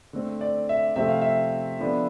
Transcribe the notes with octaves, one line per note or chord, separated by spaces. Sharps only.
D3 A3 C4
D5
E5
C3 F3 A3 C4 E5
F5
E5
D3 F3 B3 D4